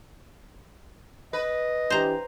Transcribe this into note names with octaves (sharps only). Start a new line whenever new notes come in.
B4 D#5
E3 D4 G4 C5 A#5